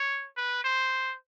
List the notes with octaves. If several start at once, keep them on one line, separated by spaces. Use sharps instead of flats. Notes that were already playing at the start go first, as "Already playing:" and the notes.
Already playing: C#5
B4
C5